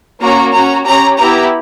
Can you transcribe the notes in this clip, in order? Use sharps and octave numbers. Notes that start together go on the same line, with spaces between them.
A#3 C#4 F#4 A#5
C#4 F#4 A#5
C#4 G4 A#5
B3 E4 G4 A#5